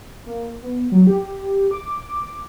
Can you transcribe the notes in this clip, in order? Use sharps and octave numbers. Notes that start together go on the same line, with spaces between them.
A#3
B3
F#3
G4
D6